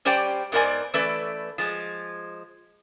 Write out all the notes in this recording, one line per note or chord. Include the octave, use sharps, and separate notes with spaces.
G3 C#4 G4 C5 D5 G5
G#2 B3 A#4 C5 D5 G#5
E3 A3 C#4 A4 B4 D5
F3 G#3